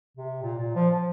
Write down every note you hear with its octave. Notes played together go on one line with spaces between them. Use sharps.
C3
A#2
A#2
F3
F3